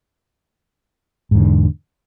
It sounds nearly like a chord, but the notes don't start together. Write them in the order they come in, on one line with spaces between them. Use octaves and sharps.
G#2 E2 D3